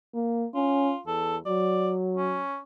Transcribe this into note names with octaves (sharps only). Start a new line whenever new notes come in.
A#3
C#4 F4
E2 A4
F#3 D5
C#4